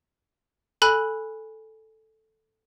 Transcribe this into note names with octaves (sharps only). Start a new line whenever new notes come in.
A4 G#5 B5 F#6